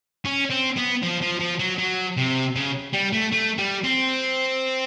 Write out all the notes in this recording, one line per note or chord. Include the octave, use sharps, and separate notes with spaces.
C#4
C4
B3
F3
F3
F3
F#3
F#3
C3
C#3
G3
A3
A3
G3
C4